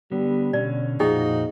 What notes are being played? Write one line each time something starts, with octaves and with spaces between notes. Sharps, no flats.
D3 G3 B3
B2 D3 C#4 D5
F2 A#2 F3 D#4 F#4 G#4 D#5 G5